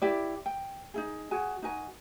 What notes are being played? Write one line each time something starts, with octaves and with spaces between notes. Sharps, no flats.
E4 G4 D5
G5
D#4 E4 G#4
F#4 G#4 G#5
D#4 F#4 A#4 G#5